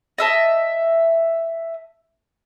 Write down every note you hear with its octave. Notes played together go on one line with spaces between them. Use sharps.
D#5 E5 A5